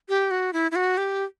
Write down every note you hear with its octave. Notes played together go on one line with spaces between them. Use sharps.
G4
F#4
E4
E4
F#4
G4